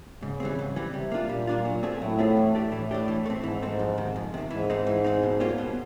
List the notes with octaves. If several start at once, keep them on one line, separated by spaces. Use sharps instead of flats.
G#2 C#3
E3 G3 C4
G#2
E3 G3 C4
C3 G3
A#3 D4 F4
A#2 G3
A#3 D4 F4
F#3
A3 C4 F4 G#4
A2 F#3
A3 C4 F4 G#4
E3
A3 D4 G4
A2 E3
A3 D4 G4
E3
A3
C4
G#2 E3
A3 C4
F2
C3 D#3
F2
C3 D#3
G#2 E3
G#3 C4 D#4
E3
G#3 C4 D#4
B2
G3 A#3 C#4 F4
B2